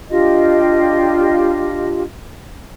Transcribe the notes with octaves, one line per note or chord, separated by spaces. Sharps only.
D4 F4 G4 D#5